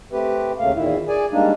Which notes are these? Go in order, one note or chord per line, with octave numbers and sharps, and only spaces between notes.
A3 C4 G4 B4
D#2 C#3 A3 A#3 F5
E2 A#2 D#3 E4
G#4 D5 G#5
G3 G#3 A#3 D4 D#4